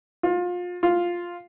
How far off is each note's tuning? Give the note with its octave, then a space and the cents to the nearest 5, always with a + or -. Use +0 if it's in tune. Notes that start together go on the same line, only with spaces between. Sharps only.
F4 +30
F4 +5